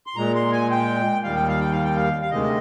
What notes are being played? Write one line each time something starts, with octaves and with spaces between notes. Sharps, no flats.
C6
A#2 G#3 A#5
C6
G#5
G5
D#2 D#3 G3 F5
G5
F5
G5
F5
G5
F5
F5
D2 C3 D#3 G#3 D#5